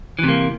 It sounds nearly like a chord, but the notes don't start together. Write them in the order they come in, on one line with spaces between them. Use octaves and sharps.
E3 C3 A#3